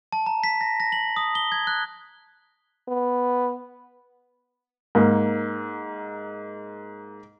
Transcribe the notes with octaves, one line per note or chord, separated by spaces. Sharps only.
A5
A#5
B6
A#6
A#6
F#7
D#6
G7
G#6
F#6
B3
G#2 A#3